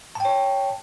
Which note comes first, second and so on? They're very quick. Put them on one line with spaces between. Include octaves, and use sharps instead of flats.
A5 G5 C#5